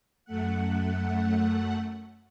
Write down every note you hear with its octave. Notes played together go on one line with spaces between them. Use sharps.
F#2 A3 F#5